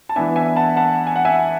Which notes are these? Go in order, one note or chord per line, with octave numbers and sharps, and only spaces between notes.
A5
E3 B3 D4 E5 G#5
E5 G#5
F#5 A5
F#5 A5
G#5
F#5
E5 G#5